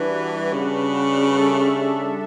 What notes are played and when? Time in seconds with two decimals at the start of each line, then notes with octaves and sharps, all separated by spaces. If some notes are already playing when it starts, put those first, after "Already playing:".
Already playing: E3 G3 D4 F#4 B4
0.53 C#3
1.36 G3 D4 A4 E5